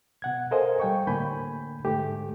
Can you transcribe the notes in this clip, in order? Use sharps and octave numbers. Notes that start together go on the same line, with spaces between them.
B2 F#5 G#6
A4 A#4 C5 D#5 F5 G#5
G3 G5 C#6
A2 D3 A#3 G#5 B5 G6
G#2 D3 A3 G4